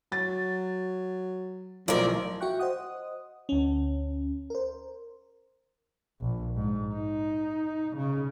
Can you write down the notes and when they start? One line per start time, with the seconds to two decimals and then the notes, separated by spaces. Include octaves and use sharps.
0.12 F#3 A6
1.88 B1 A2 F3 A#4 D5
2.40 F#4 E5 G5 C#6 F#6
2.59 C5 D#5 F#5 D#6
3.49 D2 C#4
4.50 A#4 C5
6.21 A#1
6.56 G#2
6.94 D#4
7.97 C#3